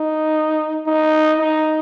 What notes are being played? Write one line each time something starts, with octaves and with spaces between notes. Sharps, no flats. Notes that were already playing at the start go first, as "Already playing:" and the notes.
Already playing: D#4
D#4
D#4